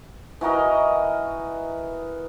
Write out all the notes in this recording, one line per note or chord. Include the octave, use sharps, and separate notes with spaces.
E3 F#4 A#4 D#5